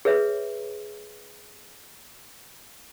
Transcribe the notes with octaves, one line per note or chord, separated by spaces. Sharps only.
G#4 B4 C#5 E5